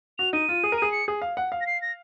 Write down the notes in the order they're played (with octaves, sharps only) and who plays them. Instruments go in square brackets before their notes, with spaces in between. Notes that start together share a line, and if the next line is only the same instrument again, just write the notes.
[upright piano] F#4 [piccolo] F7
[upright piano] D#4 [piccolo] D#7
[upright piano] F4
G#4
A#4
[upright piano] G#4 [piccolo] D#7
[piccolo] C#7
[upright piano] G#4
F5
F#5
F5
[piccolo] A#6
C7
A#6